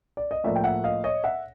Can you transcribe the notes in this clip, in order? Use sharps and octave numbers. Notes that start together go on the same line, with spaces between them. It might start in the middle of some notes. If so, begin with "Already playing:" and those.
D5
D#5
A2 F3 A#3 D5 E5
G5
E5 F#5
D#5 F5
C#5 D#5
E5 F#5